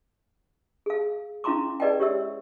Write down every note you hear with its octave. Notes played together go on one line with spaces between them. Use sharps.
G#4 F5
C#4 E4 F5 A#5 C6 D6
G#4 B4 D5 D#5 F#5 G5
G4 C#5 E5 E6